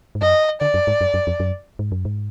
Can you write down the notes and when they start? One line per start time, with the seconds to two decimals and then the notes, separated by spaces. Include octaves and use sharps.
0.15 G#2
0.22 F#2 D#5
0.61 D3 D5
0.74 F#2
0.87 G#2
1.01 F#2
1.14 F#2
1.27 F2
1.40 F#2
1.79 G#2
1.92 F#2
2.05 G#2